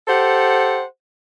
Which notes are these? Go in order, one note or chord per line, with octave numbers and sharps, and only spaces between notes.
G4 A4 C5 F#5